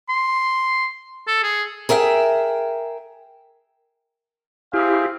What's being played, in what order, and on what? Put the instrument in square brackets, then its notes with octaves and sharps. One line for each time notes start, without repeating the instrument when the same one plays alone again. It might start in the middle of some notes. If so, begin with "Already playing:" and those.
[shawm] C6
A4
G#4
[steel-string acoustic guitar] G#4 A#4 E5 F#5 G5
[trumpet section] C4 G#4 F5 [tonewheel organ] E4 G4